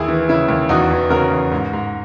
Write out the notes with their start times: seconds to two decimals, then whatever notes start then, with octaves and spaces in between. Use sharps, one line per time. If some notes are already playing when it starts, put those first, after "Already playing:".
Already playing: D#2 E4 G#4
0.08 E3
0.29 C#3 E4
0.49 D#2
0.69 E2 D#4 F#4
0.90 E3
1.10 C#3 F#4 A#4
1.31 E2
1.52 G#2
1.73 G#2